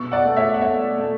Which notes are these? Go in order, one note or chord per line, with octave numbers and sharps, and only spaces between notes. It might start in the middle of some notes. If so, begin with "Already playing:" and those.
Already playing: B2 C#6 E6
D5 F#5
A3
C#5 E5
F#5
A3 C#5 E5
A3